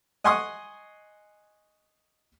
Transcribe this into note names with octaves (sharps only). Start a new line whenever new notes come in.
D#5 F#5 G#5 C6 C#6 D#6